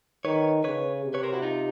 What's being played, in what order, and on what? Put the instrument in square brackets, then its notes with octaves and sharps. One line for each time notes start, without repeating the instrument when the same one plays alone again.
[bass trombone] D#3 [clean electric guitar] B4 C#5
[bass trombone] C#3 [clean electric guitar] B4 C#5
[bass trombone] C3
[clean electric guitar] B4 C#5
A#4 C5
E4 F#4
D#4 F4